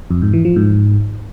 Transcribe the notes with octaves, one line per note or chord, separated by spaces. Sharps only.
F2
G#2
E3
F3
G#2